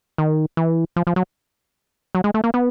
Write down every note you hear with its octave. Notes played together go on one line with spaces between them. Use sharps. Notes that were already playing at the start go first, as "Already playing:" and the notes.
D#3
E3
F3
F3
F#3
F#3
G#3
A3
A#3
B3